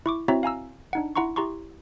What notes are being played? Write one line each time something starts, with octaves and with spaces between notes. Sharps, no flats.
E4 C#6 D6
C4 E4 F#4 C#5 E5 A#5
F5 G#5 A#5 E6
D4 D#4 F#5
E4 F#5 A#5 C6 C#6
E4 G4 A#5 C6 C#6